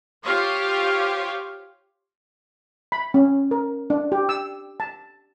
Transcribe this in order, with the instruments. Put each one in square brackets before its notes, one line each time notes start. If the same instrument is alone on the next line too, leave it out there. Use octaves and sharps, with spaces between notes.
[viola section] F4 G4 C5 C#5 F5
[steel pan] B5
C#4
A#4
D4
G4
E6
A5